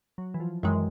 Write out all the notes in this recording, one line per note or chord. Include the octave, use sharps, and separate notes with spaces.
F#3
E3
F3
F#2 D#3 E3 G#3